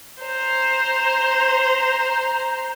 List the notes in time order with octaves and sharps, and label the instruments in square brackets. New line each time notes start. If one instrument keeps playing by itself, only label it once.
[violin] C5 A#5